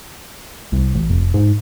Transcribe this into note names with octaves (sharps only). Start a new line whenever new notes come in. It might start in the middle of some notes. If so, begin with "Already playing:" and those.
C2
A1
F1
G#2